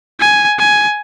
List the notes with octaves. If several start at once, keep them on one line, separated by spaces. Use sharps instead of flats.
G#5
G#5